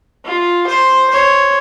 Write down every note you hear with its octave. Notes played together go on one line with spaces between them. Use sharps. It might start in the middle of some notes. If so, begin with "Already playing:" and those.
F4
C5
C5 C#5